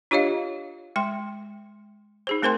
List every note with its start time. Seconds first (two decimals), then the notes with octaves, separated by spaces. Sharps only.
0.11 D4 F4 G4 C#5 D#5 F5
0.96 G#3 G5 C6
2.27 D#4 G#4 C5
2.42 A3 C4 A#4 C5 G5 C6